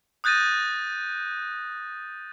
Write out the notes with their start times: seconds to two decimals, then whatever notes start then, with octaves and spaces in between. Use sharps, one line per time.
0.24 D#6 F#6 G6 A6 A#6 D#7